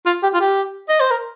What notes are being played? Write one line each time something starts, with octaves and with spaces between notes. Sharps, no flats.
F4
G4
F4
G4
D#5
C5
A#4